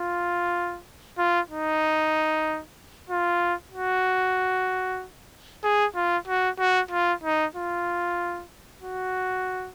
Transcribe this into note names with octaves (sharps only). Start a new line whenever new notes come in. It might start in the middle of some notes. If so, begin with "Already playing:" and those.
Already playing: F4
F4
D#4
F4
F#4
G#4
F4
F#4
F#4
F4
D#4
F4
F#4